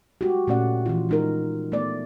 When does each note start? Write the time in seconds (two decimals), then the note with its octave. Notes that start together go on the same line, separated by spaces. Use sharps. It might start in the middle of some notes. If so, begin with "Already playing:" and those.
0.21 G#3 F#4 G4
0.48 A#2 A3 C#4 D5 F#5
0.86 E3 F3 F4
1.09 G#3 D#4 A#4
1.72 A3 B3 D5